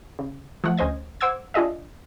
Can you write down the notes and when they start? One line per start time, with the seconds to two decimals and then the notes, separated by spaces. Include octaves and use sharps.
0.19 C#3
0.64 F3 A3 F#5
0.78 D2 C#4 C5 D#5 G#6
1.21 C5 F#5 D6 E6 G#6
1.54 D4 F4 G#4 D#5 E5